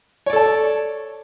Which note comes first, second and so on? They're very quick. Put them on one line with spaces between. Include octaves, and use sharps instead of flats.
C#5 D5 A4 A5